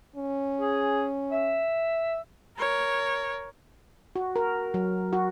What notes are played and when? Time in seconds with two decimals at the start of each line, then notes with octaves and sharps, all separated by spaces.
0.16 C#4
0.61 G#4
1.32 E5
2.57 A#4 C#5
4.16 F#4
4.36 A#4
4.74 F#3
5.13 F#4